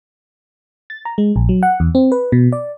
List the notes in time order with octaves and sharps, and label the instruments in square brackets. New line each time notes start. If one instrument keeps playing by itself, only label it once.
[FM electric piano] A6
A#5
G#3
A#1
F#3
F#5
E2
C4
B4
B2
D5